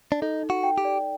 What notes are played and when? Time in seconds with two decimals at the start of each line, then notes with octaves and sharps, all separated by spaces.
0.12 D4
0.22 D#4 A4
0.43 D#4
0.50 F#4
0.63 G5
0.78 G4
0.85 D5